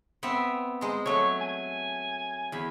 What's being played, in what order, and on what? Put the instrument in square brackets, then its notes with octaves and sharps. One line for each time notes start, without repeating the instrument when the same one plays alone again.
[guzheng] B3 C4 E5
[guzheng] G#3 A#5 [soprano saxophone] C5
[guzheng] F#3 A3 [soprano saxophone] C#5
[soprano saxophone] G#5
[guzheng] E2 B5